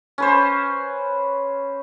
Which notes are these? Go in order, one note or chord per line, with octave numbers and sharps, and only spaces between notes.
C#4 B4 C5